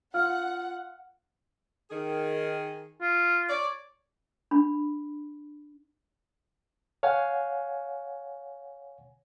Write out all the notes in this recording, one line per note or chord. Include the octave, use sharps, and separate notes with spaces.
F4 F5 F#5 F6
D#3 G#4
F4
C#5 D5
D4 B5
C#5 F5 F#5 G#5